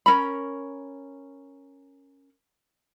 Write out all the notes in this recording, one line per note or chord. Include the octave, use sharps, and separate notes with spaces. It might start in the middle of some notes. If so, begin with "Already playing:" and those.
C#4 A#4 B5